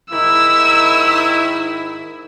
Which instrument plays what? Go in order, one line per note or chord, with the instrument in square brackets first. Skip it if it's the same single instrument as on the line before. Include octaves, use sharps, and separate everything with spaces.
[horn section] G#2 D#3 E4 [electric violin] E6